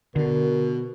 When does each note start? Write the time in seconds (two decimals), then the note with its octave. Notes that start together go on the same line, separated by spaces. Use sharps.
0.16 B2 D3 A#4